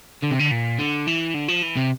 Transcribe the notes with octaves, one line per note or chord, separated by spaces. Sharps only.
D3
C3
D3
A#2
D3
E3
D3
F3
E3
C3